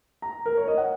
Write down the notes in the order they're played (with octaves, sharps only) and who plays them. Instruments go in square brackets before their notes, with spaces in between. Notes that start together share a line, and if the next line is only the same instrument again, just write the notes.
[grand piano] A#5
A#4
C#5
D#5
F#5